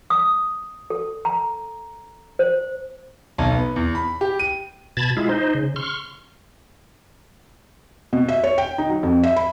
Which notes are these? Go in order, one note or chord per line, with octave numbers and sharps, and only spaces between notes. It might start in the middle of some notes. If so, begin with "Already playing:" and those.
D#6
A4
A#5
C5
B1
B3
E2
B5
G4
D#7
B2 A5 B5 G#6 A6
G#3 E4 F4
D#4 C5
C#3
C6 C#6 F6
B2
E5
C#5
G5
D#4
F#3
F2
E5
B5